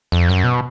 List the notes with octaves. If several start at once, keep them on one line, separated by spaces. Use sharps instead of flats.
F2
F#2
B2